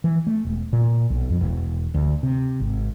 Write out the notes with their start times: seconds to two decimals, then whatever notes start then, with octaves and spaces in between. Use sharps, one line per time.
0.04 E3
0.27 A3
0.45 E1
0.73 A#2
1.10 B1
1.30 F2
1.41 E1
1.94 D2
2.23 C3
2.60 G#1